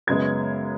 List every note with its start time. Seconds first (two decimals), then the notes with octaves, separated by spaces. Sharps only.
0.07 F#2 C#3 G#3 B3 G#6